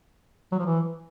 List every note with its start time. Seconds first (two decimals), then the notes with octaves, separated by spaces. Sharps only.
0.52 F#3
0.59 F3
0.66 E3